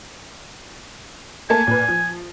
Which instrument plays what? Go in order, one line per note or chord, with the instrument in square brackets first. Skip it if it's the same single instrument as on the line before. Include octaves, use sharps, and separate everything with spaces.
[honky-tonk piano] A3 A#3 A5 [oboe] G#5
[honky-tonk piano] A#2 B4
F3